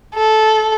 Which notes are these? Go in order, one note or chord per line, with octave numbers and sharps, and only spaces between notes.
A4